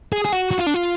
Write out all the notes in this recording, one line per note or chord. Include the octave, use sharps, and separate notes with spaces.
G#4
G#4
F#4
F#4
F4
D4
F4